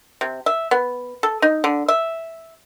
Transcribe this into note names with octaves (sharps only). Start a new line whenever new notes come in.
C3
E5
B3
A4
D#4
D3
E5